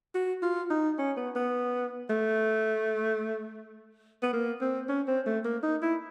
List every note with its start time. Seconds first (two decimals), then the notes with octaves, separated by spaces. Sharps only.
0.15 F#4
0.42 F4
0.70 D#4
0.99 C#4
1.17 B3
1.36 B3
2.10 A3
4.22 B3
4.33 A#3
4.61 C4
4.89 C#4
5.07 C4
5.26 A3
5.45 A#3
5.63 D#4
5.82 E4